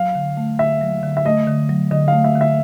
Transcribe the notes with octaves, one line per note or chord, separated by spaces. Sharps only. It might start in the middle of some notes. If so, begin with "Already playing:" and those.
Already playing: F#3 F5
D3
A3
D3 E5
F#3
D3
E5
A3 D#5
D3
F#3
D3 D#5
A3 F5
E5
D3
E5